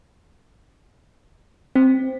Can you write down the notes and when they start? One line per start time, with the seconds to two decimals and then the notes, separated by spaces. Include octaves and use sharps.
1.76 C4